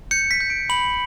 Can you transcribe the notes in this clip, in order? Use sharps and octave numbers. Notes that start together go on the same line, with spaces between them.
G6 C#7
B6
G6
D7
B5 F#7